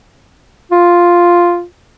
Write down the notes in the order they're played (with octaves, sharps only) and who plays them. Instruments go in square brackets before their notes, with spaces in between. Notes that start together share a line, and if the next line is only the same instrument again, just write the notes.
[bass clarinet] F4